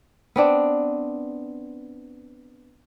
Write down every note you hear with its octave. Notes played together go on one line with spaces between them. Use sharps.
B3 C4 D4